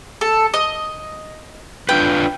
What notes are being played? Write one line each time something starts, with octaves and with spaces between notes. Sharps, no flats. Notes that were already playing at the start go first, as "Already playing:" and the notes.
A4
D#5
D4 F4 B4 G5